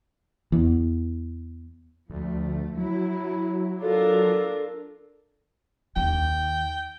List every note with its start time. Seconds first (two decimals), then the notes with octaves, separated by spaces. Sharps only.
0.52 E2
2.10 D2 F3 A3
2.77 F#3 E4
3.82 D4 F4 A4 A#4
5.96 D#2 G5